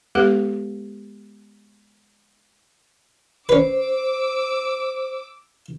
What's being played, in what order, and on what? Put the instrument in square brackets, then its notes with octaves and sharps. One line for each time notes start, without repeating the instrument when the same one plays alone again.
[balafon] G#3 B3 G4 A4 B4 F#5
[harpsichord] C#4 B4 [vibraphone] C5 [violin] D6 E6